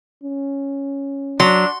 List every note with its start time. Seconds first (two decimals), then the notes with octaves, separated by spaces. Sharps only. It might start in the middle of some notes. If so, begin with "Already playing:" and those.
0.24 C#4
1.40 F#3 D4 C6